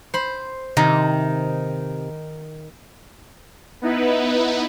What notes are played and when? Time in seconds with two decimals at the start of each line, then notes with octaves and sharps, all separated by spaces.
0.14 C5 B5
0.77 C3 D#3 D#4
3.82 B3 D#4 E4 B4